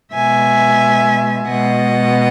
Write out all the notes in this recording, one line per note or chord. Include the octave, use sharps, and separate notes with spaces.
B2 G#3 E5 G#5
B2 G#3 D#5 F#5